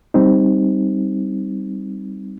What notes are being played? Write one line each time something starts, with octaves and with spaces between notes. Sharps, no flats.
G3 C4 D#4